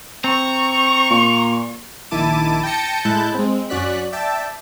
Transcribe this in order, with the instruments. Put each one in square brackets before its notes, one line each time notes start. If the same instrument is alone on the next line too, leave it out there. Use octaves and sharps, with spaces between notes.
[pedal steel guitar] C4 [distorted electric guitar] A#5 [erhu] C#6
[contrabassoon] A#2
[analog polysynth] A#1 D#3 E4 A5 D6 D#7
G5 A5 G6 A#6 C#7 D#7
A2 G#3 E4 A5 F#6 G6
G#3 C4
F#2 C#4 F#4 D5 F#6 B6
D5 E5 G5 A5